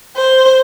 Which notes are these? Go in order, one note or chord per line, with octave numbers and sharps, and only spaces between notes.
C5